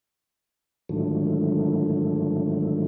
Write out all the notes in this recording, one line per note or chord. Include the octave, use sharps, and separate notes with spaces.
G#2 D3 D#3 F3 F#3 A3